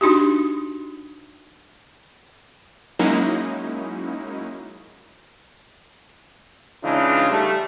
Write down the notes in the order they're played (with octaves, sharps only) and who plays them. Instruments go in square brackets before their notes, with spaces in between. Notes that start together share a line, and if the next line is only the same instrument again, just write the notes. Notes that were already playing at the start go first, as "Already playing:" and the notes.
[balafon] D4 D#4 F#4 G4
[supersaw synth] F#3 G#3 A#3 C#4 D#4 E4
[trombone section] C#3 E3 G#3 D4 D#4 F4
G3 A3